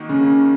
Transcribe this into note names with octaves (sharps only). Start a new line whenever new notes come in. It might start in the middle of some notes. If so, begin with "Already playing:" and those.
Already playing: D#3 A#3 D#4 F#4
C#3